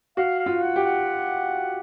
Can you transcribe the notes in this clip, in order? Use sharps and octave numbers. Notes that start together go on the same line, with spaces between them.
F#4 F5
F5
F4
F#5
G4
F#5